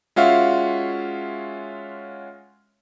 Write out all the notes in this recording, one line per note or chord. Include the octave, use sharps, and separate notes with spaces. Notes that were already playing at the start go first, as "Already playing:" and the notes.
G#3 C#4 F4 F#4 E5 F5